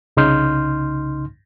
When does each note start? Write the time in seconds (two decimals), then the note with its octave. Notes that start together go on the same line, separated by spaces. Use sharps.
0.17 C2 C#3 D#4 C6 F6 G6